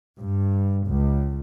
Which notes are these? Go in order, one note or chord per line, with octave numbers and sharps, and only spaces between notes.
G2
C#2